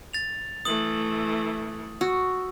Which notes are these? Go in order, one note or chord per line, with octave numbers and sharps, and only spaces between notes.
A6 F7
E3 A3 D#6 F#7
F#4 E6